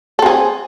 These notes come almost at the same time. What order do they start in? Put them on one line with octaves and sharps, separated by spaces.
A4 C4 G#4